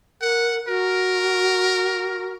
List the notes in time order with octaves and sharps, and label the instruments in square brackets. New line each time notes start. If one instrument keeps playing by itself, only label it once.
[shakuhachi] A#4 [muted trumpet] F#5
[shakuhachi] F#4 [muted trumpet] A#4